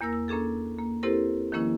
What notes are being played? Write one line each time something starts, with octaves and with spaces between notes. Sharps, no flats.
E2 A#3 A#4 E6 A#6
E6
A#3 C#4 D4 G#4 A4
A#3
C4 E4 G4 A4 A#4 C5
D#3 F3 G#3 A#3 C#4 E4